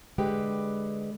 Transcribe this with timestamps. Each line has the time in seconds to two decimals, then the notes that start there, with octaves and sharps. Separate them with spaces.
0.18 D3 G#3 G4 B4